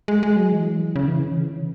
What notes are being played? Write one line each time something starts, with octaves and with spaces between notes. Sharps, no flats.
G#3
G#3
F#3
E3
C#3
E3
C#3
E3
C#3
E3